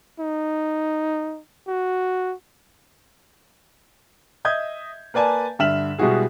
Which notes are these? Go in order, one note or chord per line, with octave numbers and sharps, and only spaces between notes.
D#4
F#4
D#5 E5 D#6 G6 G#6
A#3 B4 D5 G#5 A5
G2 D3 E5 F6 E7 F#7
B2 G3 G#3 E4 F#4 G#4